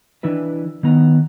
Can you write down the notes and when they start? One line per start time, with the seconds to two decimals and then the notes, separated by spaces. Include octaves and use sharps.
0.23 E3 D4 E4 B4
0.83 D#3 B3 A#5